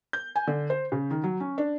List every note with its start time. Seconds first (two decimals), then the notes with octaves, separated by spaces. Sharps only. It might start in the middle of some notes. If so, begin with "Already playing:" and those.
0.13 G6
0.36 G#5
0.47 D3
0.70 C5
0.92 C#3
1.11 D#3
1.24 F#3
1.40 C#4
1.58 D4